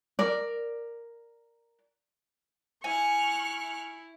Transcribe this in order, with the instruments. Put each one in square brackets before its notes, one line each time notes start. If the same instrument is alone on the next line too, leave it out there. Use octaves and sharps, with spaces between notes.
[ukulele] A#4 D5
[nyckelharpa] E4 [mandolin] G#5 [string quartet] C#6 F6 F#6